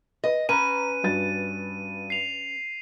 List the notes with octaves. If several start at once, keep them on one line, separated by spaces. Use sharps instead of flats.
B4 D#5
C#4 B4 A#5 D#7
G2 F#4 A6
C7 F7